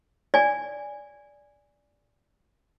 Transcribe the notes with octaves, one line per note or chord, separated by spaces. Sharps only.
D5 G#5